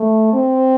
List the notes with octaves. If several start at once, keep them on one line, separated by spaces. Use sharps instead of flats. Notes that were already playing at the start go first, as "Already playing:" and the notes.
Already playing: A3
C4